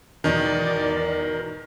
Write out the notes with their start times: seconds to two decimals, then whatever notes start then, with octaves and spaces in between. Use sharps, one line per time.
0.24 E2 G#2 B2 D#3 D#4 A#4 D5